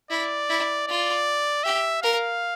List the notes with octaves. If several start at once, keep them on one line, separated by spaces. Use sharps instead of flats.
E4 D5
E4
F4 D5
G4 E5
A#4 F5